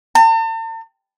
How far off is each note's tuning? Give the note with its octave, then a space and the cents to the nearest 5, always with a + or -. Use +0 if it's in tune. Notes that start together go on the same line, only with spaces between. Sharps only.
A5 +45